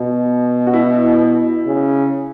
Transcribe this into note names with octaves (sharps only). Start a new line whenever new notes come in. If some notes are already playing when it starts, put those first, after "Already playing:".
Already playing: B2
F#4
E4
C#3